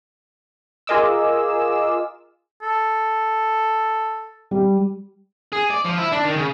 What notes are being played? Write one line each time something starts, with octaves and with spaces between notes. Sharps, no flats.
F4 G#4 A#4 D#5 D6 E6
A4
G3
G#4
D5
F3
E4
D4
D#3
C#3